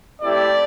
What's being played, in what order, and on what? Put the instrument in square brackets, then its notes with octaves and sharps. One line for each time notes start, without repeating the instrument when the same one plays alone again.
[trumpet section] A3 C4 E4 G4 D5